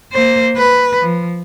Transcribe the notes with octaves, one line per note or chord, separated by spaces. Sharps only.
A#3 C5
B4
F3